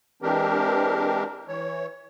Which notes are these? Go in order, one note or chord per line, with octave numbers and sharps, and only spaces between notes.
E3 G#3 C4 D4 G4 A#4
E3 C#5